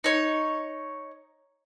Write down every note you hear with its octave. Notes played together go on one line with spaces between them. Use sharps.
D#4 C#5